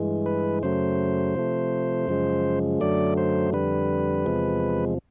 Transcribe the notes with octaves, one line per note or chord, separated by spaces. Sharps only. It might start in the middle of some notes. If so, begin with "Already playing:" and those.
Already playing: G2 E3 G#3
B4
F#2 C#3 F#3 A3 C5
C3 F3 A3
F#2 C#3 F3 G#3
F#2 D3 F#3 A3 D5
C5
F2 D3 G3 B4
E2 C3 F3 G#3